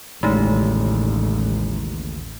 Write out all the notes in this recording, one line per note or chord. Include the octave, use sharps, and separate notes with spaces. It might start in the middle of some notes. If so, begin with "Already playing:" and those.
A1 D#2 A2 C#3 G#3 A3 D#4